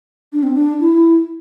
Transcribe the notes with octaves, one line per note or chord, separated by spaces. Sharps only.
D4
C4
D4
E4